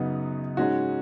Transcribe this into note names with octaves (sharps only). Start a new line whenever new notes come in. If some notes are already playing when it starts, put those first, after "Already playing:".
Already playing: F#2 C#3 B3 D#4 F#4
G#2 G#3 C#4 F#4